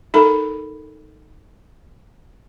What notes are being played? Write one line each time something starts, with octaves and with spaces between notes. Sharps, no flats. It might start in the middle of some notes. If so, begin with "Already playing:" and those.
D#4 A4 A#4 B5